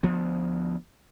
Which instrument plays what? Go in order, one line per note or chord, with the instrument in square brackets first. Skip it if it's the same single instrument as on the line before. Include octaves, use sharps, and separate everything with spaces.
[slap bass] D2 F3 B3